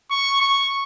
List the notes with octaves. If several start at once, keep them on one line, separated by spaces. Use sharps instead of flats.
C#6
C#6